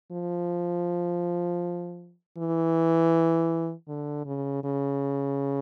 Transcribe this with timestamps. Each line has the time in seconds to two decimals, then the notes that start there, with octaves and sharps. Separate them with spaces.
0.11 F3
2.37 E3
3.88 D3
4.26 C#3
4.64 C#3